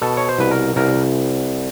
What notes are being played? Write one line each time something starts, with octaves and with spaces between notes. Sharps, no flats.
B2 A4
C#5
C5
C2 B4
A#4
C2 A#4